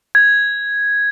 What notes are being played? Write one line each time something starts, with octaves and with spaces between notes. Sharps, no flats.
G#6